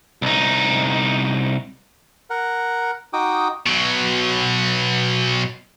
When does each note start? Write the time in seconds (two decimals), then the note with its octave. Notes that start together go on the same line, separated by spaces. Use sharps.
0.22 C2 D#4
2.30 A#4 F#5
3.13 D#4 F#4 G5 D6 D#6
3.66 B2 F#3